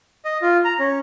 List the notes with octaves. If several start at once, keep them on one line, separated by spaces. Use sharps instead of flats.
D#5
F4
A#5
C#4